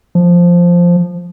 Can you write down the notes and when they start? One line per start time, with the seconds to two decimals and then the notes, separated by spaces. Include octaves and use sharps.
0.15 F3